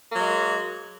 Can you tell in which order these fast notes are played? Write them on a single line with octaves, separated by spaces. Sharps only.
A#3 F#3 G#3